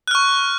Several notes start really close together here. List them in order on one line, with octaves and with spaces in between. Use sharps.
F#6 F6 C#6